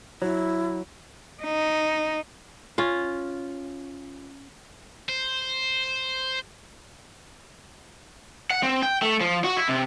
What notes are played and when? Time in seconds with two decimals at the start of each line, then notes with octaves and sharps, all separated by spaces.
0.22 F#3 E4
1.43 D#4
2.78 C#4 F4
5.09 C5
8.51 F#5
8.63 C4
8.83 G5
9.02 A3
9.21 F3
9.44 F#4
9.57 E4
9.69 C3